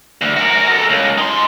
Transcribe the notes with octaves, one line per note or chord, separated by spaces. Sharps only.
D2
F#4 A#4
A4 A#4
C#2
D#4 C6